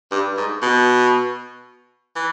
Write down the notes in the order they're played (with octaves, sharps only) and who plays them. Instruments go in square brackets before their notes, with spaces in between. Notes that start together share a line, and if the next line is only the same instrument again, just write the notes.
[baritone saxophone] G2
G#2
B2
E3